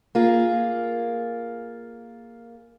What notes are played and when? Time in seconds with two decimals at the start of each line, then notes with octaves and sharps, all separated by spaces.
0.15 A#3 F4 G#4